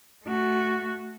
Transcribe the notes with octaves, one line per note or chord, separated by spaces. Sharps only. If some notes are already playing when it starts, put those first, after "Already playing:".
A3 F#4